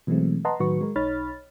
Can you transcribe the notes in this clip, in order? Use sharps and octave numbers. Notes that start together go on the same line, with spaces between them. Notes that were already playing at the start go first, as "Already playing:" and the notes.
B2 E3 F#3 G#3 A3 C4
B4 D#5 F#5 A5 A#5 C6
A2 D#3 F#3 F#4 B4 C#6
G#3 A#4
B1 D#4 C#5 B5 F6 A6